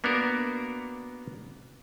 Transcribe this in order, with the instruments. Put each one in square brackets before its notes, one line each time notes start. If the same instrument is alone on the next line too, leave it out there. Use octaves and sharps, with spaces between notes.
[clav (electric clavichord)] A#3 B3 D4 F#4 A#4